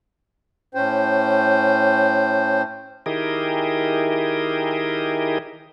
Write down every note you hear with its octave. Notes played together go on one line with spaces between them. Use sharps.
A2 C#4 C5 G5
D#3 E4 G4 G#4 A#4 D#5